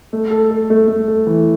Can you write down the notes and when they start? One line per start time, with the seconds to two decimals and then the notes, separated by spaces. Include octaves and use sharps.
0.13 A3
0.31 A4
0.51 A4
0.70 A3
0.88 A3
1.08 A4
1.27 E3